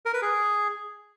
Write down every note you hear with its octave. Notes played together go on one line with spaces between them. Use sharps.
A#4
B4
G#4